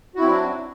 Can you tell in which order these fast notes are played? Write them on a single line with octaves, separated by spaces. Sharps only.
F#4 E4 C4 F#3 D4